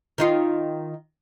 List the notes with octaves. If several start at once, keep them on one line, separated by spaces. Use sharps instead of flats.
D#3 D#4 F4